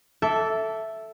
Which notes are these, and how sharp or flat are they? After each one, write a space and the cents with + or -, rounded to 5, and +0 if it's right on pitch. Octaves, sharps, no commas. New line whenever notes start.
A4 +0 E5 +0 D6 -25